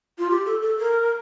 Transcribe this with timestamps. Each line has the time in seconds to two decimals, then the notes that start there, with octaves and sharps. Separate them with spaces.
0.18 F4
0.30 G4
0.46 A4
0.62 A4
0.79 A#4